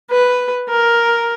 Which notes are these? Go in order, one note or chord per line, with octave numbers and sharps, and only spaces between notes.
B4
A#4